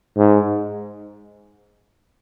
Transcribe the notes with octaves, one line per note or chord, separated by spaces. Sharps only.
G#2